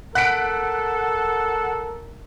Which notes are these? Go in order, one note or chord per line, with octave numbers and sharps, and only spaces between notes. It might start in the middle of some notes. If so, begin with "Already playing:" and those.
A4 A#4 F#5 F#6 B6 D7